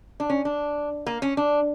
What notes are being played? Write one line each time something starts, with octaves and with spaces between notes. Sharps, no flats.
D4
C#4
D4
A#3
C#4
D4